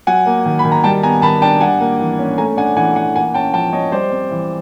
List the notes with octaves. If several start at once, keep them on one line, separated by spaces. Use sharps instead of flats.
F#3 F#5 G#5
A#3
D#3
B5
D#3
A#5
G3 G5 A5
B3 G#5 A#5
D#3 A5 B5
D4 G5 A5
G3 F#5 G#5
A#3
E3
C#4
A3 G#5 A#5
D4 F#5 G#5
E3 F#5 G#5
E3 F#5 G#5
A#3 F#5 G#5
C#4 G5 A5
F3 G5 A5
F3 C#5 D#5
G3 C5 D5
C4
E3